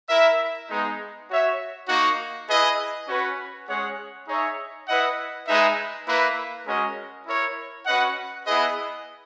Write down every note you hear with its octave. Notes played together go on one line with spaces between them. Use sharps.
E4 A#4 E5
G#3 B3 D#4
F#4 C#5 E5
A#3 D#4 F#4
E4 G#4 B4 D#5
C#4 F#4 B4
G#3 C#4 G#4 C#5 F#5
D#4 G#4 C#5 E5
E4 B4 D#5 F#5
G#3 D#4 G#4 B4 E5
A#3 E4 B4
G#3 C#4 F#4 A#4 D#5
E4 A#4 C#5
C#4 F#4 B4 D#5 F#5
B3 E4 G#4 B4 D#5